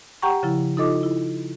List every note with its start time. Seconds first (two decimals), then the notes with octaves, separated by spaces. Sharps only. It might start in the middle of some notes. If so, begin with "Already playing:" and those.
0.22 G4 F#5 G5 A#5 C#6
0.43 C#3 F3 E4
0.77 D#4 F4 A4 D#5 D6
1.03 E4